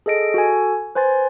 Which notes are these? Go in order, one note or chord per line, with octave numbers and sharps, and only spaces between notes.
G#4 A4 D#5 A#6 D7
F#4 A4 G#5
B4 C5 G#5 C6 A6